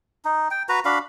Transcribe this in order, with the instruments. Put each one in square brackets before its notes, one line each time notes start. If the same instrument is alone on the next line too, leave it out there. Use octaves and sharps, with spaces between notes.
[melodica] D#4
G5
F#4 B4 A#5
D4 F#4 F5 B5